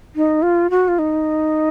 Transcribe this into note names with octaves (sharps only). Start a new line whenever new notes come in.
D#4
F4
F#4
F4
D#4